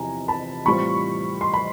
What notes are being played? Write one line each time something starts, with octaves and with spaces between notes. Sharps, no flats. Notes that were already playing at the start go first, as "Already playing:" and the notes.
Already playing: E2 C3 F3 G#5 A#5
A5 B5
A2 E3 G3 C4 F4 B5 C#6
C6
B5